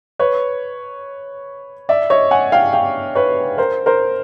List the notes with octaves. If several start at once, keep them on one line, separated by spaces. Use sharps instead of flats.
B4 C#5
D5 E5
C#5 D#5
F#5 G#5
F5 G5
F5 G5
B4 C#5
A#4 C5
A#4 C5